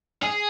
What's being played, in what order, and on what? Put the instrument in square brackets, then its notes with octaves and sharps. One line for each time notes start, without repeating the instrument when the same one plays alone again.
[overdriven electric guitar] G#4